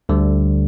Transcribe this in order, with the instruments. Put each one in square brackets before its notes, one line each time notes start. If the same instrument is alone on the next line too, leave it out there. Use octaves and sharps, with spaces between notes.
[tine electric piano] D2 D3 G3